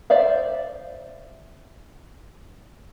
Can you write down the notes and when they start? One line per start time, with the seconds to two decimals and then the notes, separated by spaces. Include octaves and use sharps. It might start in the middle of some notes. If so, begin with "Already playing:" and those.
0.10 C5 D5 E5 F5